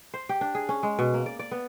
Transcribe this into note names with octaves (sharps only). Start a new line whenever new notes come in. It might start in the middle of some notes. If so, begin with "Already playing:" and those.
C5
G4
D4
G#4
C#4
G#3
B2
A#3
D5
D5
B3